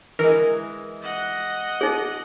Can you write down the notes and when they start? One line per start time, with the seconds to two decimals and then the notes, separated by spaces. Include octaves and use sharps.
0.19 E3 G#3 A#4
1.01 D#5 F#5
1.81 D#4 G#4